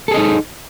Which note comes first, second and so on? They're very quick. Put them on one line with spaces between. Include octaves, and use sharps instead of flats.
A4 G#4 D#5 D#4